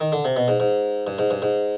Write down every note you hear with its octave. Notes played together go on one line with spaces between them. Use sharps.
D#3
D3
C3
B2
G#2
G#2
G2
G#2
G2
G#2